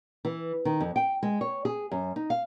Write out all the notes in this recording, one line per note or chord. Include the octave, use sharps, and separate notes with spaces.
E3
D#3
F2
G5
G#3
C#5
G#4
F#2
D#4
F5